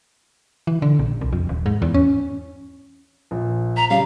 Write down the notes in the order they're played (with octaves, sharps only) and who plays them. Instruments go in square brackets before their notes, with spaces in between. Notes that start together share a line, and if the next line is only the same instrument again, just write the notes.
[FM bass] E3
D3
A#1
C2
F2
D#1
G#2
E2
C#4
[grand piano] A#1
[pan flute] A#5 [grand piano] B6
[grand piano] C#3 G3 [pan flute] F5